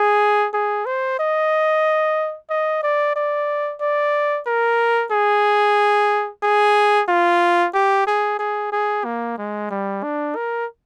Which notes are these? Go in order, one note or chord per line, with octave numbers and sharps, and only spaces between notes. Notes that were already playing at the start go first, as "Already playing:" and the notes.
Already playing: G#4
G#4
C5
D#5
D#5
D5
D5
D5
A#4
G#4
G#4
F4
G4
G#4
G#4
G#4
A#3
G#3
G3
D4
A#4